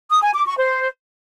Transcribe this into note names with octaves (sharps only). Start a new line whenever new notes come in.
D#6
G#5
D6
C#6
C5